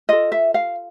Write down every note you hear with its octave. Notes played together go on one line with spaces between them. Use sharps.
F4 A4 D#5
E5
F5